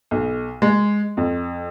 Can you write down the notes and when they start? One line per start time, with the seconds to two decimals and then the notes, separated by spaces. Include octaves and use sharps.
0.11 B1
0.62 G#3
1.17 F2